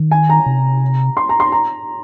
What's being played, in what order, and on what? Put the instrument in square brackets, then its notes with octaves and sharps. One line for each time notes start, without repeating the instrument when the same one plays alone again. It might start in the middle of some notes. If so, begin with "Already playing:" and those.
Already playing: [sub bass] D#3
[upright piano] G#5
A#5
[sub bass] C3
[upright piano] C6
A#5
C6
A#5